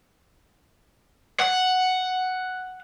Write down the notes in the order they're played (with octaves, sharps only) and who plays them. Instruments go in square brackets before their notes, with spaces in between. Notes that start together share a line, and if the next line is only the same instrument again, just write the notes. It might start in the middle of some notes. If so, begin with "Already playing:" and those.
[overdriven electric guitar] F#5